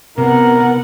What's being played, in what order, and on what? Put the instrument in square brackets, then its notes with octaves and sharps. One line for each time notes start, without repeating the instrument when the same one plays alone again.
[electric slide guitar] C3 [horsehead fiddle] B3 F#5 [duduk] A#4